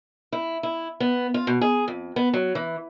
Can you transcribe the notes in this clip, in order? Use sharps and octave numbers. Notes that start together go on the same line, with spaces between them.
E4
E4
B3
F4
B2
G#4
F2
B3
F#3
E3